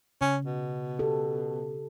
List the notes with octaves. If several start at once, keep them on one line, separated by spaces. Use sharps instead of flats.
C#3 C#4
B2
G4 A4